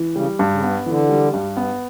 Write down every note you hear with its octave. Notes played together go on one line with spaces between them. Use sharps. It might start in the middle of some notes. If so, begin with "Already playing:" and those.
Already playing: E3
C#3 G3
G2
C#3
B3
D3 E3
G3
G2
B3